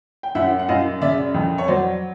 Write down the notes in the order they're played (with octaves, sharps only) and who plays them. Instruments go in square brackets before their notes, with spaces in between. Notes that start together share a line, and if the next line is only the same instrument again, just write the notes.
[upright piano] G5
F#2 E5 F#5
F#5
F#2 D#5 F5
C#3 D5 E5
F2
C#5
F#3 C5 D5